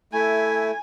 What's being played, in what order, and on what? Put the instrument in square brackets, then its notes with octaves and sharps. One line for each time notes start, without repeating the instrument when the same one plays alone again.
[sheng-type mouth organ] A3 E4 [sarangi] G#5